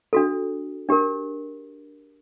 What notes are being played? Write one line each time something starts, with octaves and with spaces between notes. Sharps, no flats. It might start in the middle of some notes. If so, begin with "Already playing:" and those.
D4 F#4 A4
D4 G4 A#4